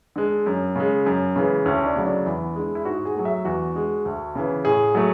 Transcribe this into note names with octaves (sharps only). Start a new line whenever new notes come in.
D3 G#3
F#2
C#3 G#3
F#2
C#3 E3 G#3
D2 C#4
D4
C#3 F#3 A3
D4
E2 E4
D3 G#3
E4
G#2 F#4
G#4
F#3 A3
E5
E2 F#4
D3 G#3
D2
C#3 E3
A2 G#4
F#3 A3